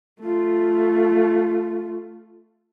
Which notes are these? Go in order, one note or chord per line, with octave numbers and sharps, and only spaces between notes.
A3 F4